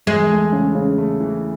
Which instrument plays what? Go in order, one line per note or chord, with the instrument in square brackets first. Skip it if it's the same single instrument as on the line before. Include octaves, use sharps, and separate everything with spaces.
[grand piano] E2 [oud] G#3
[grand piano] A3
C#3
C#3
A3
E3